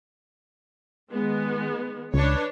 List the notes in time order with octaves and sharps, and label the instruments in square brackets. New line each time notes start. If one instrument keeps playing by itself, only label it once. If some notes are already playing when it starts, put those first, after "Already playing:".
[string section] D#3 G#3 B3
[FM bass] C#2 [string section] D4 B4 C#5